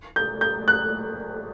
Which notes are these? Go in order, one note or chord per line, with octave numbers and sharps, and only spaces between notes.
G6
G6
F#6